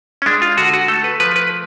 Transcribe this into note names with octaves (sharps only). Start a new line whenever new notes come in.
C#4
G#3 D4
F4
D3 F#4
F#4
A3 A4
B4
F3 B4
B4